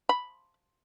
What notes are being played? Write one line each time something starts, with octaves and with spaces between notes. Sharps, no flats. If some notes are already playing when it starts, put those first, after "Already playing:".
B5